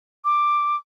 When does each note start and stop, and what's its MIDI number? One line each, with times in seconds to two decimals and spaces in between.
0.25 0.76 86